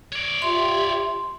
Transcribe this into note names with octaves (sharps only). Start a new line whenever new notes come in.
C#5 D5
F4 G4 E5 C6